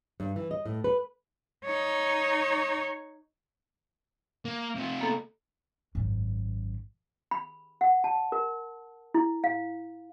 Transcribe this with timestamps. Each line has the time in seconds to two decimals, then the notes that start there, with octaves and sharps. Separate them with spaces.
0.20 G2
0.36 E3
0.51 D#5
0.66 A2
0.84 B4
1.65 D#4 C#5
4.45 A#3
4.75 C3 F4
5.01 A#3 B3 A4
5.95 G#1 F#2
7.31 B5
7.81 F#5
8.04 A5
8.32 A#4
9.14 E4
9.44 F5